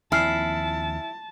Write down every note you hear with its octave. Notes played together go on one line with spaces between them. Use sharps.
D#2 F3 C4 E4 G#5 A5 F6 C7